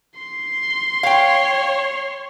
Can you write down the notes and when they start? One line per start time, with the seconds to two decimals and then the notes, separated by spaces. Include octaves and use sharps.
0.19 C6
1.03 C#5 F5 G5